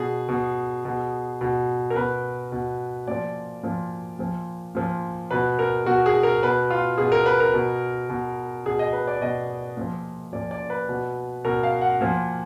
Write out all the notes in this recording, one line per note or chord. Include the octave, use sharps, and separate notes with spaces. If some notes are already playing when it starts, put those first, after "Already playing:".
Already playing: B2 G#4
B2
B2
B2
A#4
B2 B4
B2
A#2 F3 D5
A#2 F3
A#2 F3
A#2 F3
B2 B4
A#4
B2 F#4
G#4
A#4
B2 B4
F4
B2 G#4
A#4
B4
A#4
B2
B2
B2 G#4
D#5
B4
D5
B2 D#5
A#2 F3
A#2 F3 D5
D5
B4
B2
B2 A#4
F5
F#5
A#2 F3